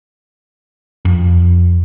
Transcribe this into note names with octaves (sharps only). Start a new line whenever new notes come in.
F2